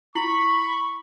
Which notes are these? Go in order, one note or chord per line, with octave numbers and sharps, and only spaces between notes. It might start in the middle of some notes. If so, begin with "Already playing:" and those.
E4 B5 C#6